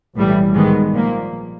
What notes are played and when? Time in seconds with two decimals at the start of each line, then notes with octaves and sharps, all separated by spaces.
0.15 B1 A2 E3 G3
0.54 G#2 D#3 G#3 B3
0.92 A#2 F3 A#3